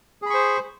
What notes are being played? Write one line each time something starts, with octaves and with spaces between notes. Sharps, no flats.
G#4 C5 B5 C#6